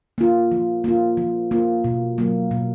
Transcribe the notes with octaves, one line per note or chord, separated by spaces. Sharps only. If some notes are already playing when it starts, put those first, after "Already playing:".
A#3 F4
F3
A#3 F4
F3
A#3 F4
B2
F#3 A#3
B2